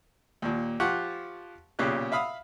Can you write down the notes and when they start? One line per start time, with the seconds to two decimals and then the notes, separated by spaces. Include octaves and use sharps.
0.42 D#2 A#2
0.80 F3 F4 G4 F#5 C#6 F#6
1.79 B1 A#2 C#3 C#4 G4 F#6
2.12 E5 F5 B5 D#6 F6